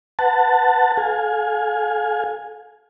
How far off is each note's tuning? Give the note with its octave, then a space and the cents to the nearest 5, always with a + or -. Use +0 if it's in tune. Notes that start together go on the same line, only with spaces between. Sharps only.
B4 +5 F#5 +0 A5 +15
A4 -35 F5 +30 G#5 +0